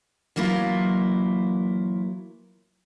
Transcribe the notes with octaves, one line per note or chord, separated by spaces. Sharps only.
E3 F#3 A#3 E4 F4